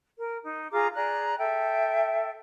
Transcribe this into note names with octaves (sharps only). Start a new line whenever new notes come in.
A#4
D#4
F4 G#4 A#5 D6
G#4 D5 A#5 F#6
A4 E5 G5